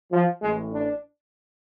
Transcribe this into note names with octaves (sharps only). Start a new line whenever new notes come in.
F3
A1 A2 E3 G#3
D4